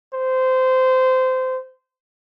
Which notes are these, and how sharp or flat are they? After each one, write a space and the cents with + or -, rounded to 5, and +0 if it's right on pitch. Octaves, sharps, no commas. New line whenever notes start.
C5 -20